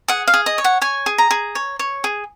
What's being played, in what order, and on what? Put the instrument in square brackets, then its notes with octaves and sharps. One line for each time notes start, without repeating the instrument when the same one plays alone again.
[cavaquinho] G#4 F#5
F5
G#4
D#5
C#5
F#5
C#5 G#5
G#4
A#5
G#4
C#5
C#5
G#4